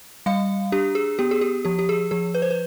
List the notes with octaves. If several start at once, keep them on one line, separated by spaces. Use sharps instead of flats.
G3 F5
D4 G4
G#4
B3 G4
G#4
G4
F3 G4
G4
G#4
F3 G#4
B4
C5
B4